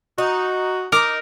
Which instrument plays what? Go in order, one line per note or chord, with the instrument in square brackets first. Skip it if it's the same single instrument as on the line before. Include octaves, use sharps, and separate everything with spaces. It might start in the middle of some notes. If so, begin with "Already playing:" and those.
[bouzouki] D#4 [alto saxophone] F#4
[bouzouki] D#4 [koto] A#4 [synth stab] D6